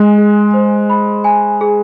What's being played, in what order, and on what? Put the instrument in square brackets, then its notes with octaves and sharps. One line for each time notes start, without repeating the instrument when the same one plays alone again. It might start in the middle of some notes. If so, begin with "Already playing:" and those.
Already playing: [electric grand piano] G#3 [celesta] G#5
[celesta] G#4
C5
B5
G#5
G#4